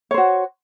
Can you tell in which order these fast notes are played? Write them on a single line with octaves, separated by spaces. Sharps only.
C#5 C5 F#4